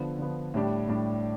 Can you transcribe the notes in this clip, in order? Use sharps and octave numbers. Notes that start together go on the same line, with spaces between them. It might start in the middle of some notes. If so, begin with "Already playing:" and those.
Already playing: D3 F3 B3
D3 F3 B3
A2 G3 D4 G4
A2 G3 D4 G4